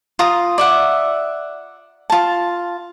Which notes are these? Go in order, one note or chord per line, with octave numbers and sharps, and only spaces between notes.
F4 A#5 D#6
D5 E5 F#5
F4 A5